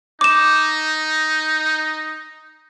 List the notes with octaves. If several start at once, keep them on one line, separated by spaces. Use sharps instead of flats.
D#4 D6 E7